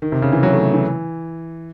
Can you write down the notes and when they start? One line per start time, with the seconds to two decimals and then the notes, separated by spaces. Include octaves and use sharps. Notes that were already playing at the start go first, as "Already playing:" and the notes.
0.02 D#3
0.12 C3
0.22 C#3
0.33 E3
0.43 F#3
0.53 A3
0.73 E3